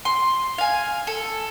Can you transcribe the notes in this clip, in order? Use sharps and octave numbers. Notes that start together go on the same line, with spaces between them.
C6
F5 G#5
A4